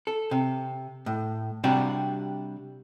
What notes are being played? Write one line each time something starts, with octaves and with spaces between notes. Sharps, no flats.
A4
C3
A2
C3 G3 D4 F#4